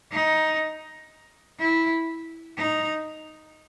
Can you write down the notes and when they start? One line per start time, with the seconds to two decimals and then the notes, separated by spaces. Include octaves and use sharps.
0.12 D#4
1.60 E4
2.58 D#4